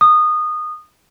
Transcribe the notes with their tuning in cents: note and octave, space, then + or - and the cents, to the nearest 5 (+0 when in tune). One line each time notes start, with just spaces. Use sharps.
D#6 -20